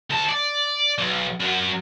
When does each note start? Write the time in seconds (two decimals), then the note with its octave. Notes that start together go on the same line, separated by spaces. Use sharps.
0.10 D2 A5
0.29 D5
0.98 B1
1.40 F#2 F#3